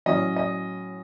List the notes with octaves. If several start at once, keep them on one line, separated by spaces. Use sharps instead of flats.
A2 F#3 C#4 D#5
D#5